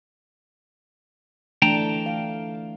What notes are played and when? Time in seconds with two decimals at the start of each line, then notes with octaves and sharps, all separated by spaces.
1.62 E3 A3 D4 G5 A5 A#5
2.06 F5